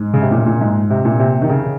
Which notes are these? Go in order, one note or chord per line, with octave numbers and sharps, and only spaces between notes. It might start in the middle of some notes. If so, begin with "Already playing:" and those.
Already playing: G#2
C#3
C3
A#2
A#2
G#2
C3
A#2
C3
D#3
C#3